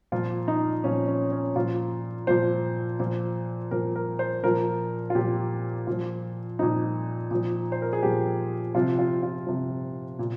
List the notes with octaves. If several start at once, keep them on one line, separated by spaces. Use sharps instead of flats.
A#2 F3 F4
D#4
A#2 F3 C#4
C#4
C#4
A#2 F3 F4
A#2 F3 C5
A#2 F3
A#2 F3 A#4
A#4
C5
A#2 F3 A#4
F4
A#2 F3 G4
A#2 F3 F4
A#2 F3 D#4
A#2 F3
C5
A#4
G#4
A#2 F3 G4
C3 F3 F4
F4
F4
C3 F3
A#2